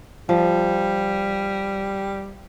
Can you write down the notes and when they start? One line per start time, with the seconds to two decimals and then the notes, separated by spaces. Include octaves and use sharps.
0.29 F3 G3